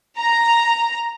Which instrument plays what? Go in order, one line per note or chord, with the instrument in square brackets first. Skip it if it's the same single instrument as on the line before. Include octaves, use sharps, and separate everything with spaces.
[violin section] A#5